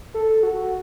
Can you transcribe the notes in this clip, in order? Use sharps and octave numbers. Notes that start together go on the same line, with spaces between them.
A4
F#4